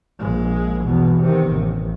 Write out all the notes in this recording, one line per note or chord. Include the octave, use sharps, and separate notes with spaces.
A#1 G#3
E2 B2
C3 D#3
A1